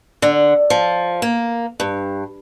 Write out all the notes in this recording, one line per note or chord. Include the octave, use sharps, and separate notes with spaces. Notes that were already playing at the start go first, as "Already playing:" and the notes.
D3
F3
A#3
G2